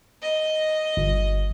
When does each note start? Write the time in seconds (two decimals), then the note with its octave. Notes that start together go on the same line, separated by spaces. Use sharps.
0.22 D#5
0.97 G1